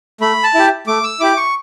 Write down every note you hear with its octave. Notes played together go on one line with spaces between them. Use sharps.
A3 B5
A5
E4 G4
A3 D6
E6
E4 G4 D6
C#6